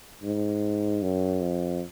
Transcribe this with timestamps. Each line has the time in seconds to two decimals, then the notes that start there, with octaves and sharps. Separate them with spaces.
0.23 G#2
1.02 F#2
1.41 F2